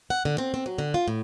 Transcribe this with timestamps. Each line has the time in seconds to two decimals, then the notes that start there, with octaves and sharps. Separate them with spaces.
0.10 F#5
0.25 D3
0.38 C4
0.54 C4
0.66 F#3
0.78 D3
0.94 F4
1.08 A2